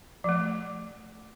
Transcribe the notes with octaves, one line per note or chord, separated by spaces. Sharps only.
F3 A3